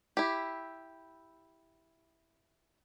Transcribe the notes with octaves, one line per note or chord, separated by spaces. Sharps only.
E4 G4